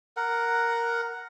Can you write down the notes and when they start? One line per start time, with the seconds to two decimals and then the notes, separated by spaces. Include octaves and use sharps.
0.17 A#4 F#5